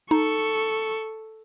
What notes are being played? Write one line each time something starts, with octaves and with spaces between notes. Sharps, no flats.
D#4 A4 C#6